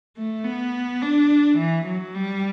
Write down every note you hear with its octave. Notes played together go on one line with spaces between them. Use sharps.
A3
B3
D4
E3
F#3
G3